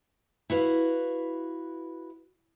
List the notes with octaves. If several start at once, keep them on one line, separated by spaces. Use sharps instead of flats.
E4 F#4 B4 F5